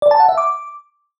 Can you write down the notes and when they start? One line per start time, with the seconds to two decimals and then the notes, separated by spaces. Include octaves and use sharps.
0.02 D5
0.11 A5
0.20 F#5
0.29 E5
0.38 D6